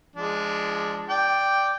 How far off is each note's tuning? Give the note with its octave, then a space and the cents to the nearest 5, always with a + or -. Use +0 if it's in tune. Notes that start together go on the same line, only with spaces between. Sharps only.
F3 -30 G#3 +0 D4 +0
D5 +0 G5 +0